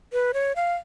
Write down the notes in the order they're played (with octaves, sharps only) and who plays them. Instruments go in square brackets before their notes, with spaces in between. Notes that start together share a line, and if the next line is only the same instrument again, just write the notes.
[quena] B4
C#5
F5